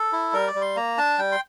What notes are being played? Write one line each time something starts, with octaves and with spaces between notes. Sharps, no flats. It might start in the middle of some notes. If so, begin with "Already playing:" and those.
Already playing: A4
E4
G3 A#4
D5
G3
C6
A#3 A#5
D4 A5
G3 G5
C6